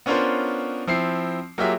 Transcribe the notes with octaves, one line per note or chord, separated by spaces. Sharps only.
B3 C#4 D4 F4 A#4 C5
F3 C4 E4 C7
F#3 A#3 F4 G4 G#4 E5